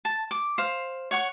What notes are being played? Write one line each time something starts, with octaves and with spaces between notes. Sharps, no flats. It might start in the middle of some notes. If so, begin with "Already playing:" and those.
A5
D6
C5 F5
C#5 F#5 C#6